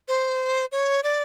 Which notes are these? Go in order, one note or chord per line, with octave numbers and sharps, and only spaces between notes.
C5
C#5
D5